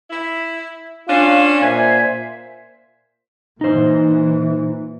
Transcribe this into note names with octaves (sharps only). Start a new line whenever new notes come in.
E4
C#4 D4 F4 F5
A#2 C5 E5 G#5
A#2 E3 D#4 C5